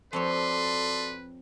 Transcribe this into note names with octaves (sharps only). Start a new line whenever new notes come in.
F2 C4 F#4 A4 B4 C#5 D5 C6